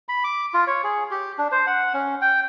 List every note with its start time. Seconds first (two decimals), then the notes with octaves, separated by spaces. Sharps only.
0.09 B5
0.24 D6
0.54 F4
0.67 C#5
0.84 G#4
1.11 G4
1.38 D4
1.52 C5
1.67 F#5
1.94 C#4
2.22 G5